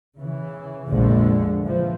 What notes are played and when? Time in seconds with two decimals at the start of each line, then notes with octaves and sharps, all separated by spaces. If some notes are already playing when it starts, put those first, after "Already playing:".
0.18 C#3 E3
0.89 A#1 F2 D3 F3 G#3 A3
1.63 E3 F3